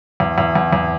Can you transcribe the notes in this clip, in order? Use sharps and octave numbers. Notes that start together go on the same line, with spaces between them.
E2
E2
E2
E2